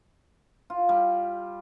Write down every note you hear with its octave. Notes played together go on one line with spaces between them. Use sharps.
F4
G3